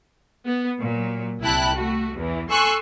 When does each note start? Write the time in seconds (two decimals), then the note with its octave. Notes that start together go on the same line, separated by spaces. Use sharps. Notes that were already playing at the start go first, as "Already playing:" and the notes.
0.46 B3
0.80 A#2 F#3
1.42 C2 E4 G5 A5 B5 F#6
1.74 A3 F#4
2.16 E2 E3
2.49 A4 G#5 C6 C#6 E6 F#6